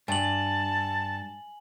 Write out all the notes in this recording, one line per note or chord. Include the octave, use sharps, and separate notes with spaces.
G2 G#5 A5 F#7